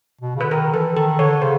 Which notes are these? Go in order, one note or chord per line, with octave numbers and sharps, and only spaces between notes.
B2
C#3
D3 B4
D#3 A#4
E3 A4
D#3 A4
D3 C#5
C#3 C5